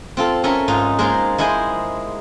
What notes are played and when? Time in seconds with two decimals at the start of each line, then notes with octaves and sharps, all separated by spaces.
0.17 C4 F4 A4
0.44 C#4 A4 A#4 C#5 E5
0.68 G#2 D#4 F4
0.99 G#3 A#3 F4 A#4 C5
1.38 G#3 E4 G#4 C5 G#5